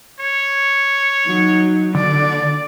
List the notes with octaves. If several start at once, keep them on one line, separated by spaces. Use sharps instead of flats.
C#5
F#3 D#4
D3 D5